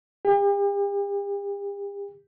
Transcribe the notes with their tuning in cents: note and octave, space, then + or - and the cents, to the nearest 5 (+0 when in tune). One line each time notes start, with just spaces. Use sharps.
G4 +45